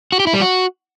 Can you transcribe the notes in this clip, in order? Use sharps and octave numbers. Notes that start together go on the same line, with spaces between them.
F#4
G4
E4
G3
F#4